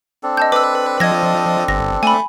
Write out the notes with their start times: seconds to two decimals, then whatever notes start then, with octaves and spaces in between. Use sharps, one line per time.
0.23 C4 D4 A4
0.37 D#5 A5 G6
0.52 B4 D6 E6
1.00 F3 D#5 G#6 A#6
1.68 G1 A#6
2.03 A3 G#5 B5